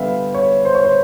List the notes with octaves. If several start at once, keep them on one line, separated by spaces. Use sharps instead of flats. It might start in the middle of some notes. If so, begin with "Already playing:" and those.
Already playing: D3 G3 B3 E5 F5
C#5
C5
C#5
C5